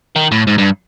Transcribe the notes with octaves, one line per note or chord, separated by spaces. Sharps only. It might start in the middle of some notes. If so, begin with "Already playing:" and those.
D#3
A2
G#2
G2